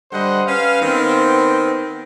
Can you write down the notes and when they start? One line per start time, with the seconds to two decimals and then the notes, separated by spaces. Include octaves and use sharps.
0.12 D3 G3 C5 D#5 F#5
0.47 C#4 B4 F5
0.82 D#3 B3 C4